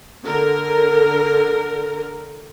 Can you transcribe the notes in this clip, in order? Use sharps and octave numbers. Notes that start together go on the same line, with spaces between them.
D3 A#4